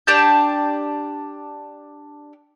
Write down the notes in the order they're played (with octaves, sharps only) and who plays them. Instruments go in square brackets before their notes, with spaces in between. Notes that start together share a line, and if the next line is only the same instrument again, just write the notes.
[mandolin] D4 G4 A5 G6